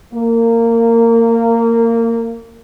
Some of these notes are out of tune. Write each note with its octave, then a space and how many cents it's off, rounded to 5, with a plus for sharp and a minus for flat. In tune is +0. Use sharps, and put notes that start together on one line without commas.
A#3 -20